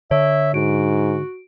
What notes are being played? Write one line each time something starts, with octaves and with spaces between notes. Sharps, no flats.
D3 C#5 E5
G#2 F#4 D7